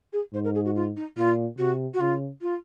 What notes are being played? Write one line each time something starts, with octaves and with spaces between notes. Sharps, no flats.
G#4
G#2 C5
A#4
G#4
F#4
F4
D#4
A#2 F4
C3 F#4
F#4
C#3 F4
F4